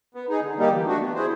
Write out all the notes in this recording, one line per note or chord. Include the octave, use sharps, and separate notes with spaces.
B3
D#4 G#4
D3
G3 A#3 D#4 G4
E3
A3 D4 F#4
B3
E4 G#4 C5